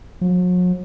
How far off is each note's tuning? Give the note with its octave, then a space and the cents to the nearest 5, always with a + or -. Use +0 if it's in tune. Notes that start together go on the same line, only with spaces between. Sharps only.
F#3 -45